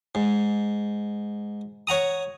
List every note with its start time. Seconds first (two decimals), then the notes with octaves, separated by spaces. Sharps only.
0.15 G#2
1.87 C#5 F#5 A#5 D#6